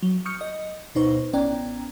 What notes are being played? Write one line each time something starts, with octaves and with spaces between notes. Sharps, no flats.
F#3
C#6 D#6 F6 G6 C#7
D#5
D2 B2 D#4 B4 C5 C#6
A1 B3 C#4 D5 G5 A#5